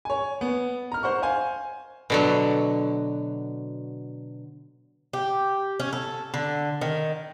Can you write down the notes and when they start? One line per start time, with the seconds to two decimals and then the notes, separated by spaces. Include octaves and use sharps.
0.05 C#5 G#5
0.41 B3
0.92 A#5 F6
1.03 C5 F#5 C#6
1.22 C5 F5 G#5
2.10 B2 D3 F#3
5.13 G4
5.80 C#4
5.93 A4
6.34 D3
6.81 D#3